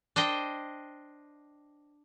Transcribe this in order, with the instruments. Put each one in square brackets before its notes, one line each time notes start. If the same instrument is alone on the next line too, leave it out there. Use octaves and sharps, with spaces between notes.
[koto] D4 C5 D#5 G5